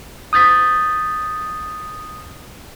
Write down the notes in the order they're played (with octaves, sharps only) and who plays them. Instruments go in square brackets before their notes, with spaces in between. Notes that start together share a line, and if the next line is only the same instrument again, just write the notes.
[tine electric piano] D#6 G6 A6 B6